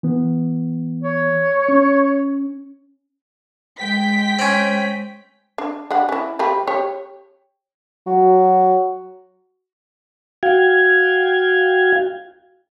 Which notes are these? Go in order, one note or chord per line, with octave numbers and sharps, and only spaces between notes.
E3 B3
C#5
C#4
G#3 G5 B6
C4 C#4
D4
G3 D4 F#5
C#4 E4
F3 G4 B5
G4 C#5
F#3 F#4
F#4 F5 G5 G#6